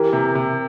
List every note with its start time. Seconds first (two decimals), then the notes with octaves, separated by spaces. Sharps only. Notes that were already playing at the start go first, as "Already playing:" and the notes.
Already playing: E3 G4 A#4
0.13 C3
0.35 C3